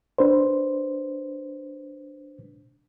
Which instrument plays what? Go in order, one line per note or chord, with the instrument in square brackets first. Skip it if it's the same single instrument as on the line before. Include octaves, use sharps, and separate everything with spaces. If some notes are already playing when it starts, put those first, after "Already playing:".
[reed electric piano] D4 B4 C5